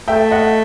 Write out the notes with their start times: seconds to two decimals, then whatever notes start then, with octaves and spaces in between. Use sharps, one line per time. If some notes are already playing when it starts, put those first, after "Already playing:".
0.08 A3 E5 G5
0.31 D#5 F#5